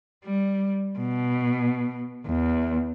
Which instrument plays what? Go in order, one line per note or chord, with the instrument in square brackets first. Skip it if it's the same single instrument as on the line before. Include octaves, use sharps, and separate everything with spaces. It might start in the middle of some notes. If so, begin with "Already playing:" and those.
[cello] G3
B2
E2